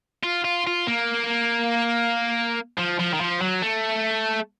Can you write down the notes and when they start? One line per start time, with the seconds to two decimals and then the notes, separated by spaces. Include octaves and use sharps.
0.24 F4
0.44 F4
0.67 F4
0.87 A#3
2.78 F3
2.99 F3
3.13 D#3
3.20 F3
3.41 F#3
3.62 A3